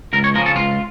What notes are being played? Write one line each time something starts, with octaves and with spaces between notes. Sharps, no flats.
C#2 A#4
C#5
C#3 F3 A#4
A4
C#2 F4